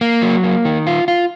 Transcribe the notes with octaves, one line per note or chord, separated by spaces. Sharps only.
A#3
F#3
A#3
D#3
F4
F4